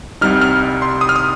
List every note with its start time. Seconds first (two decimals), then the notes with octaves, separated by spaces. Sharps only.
0.21 C2 C3 G3 D#4 F6
0.41 F6
0.82 C6
1.01 D#6
1.09 F6
1.16 D#6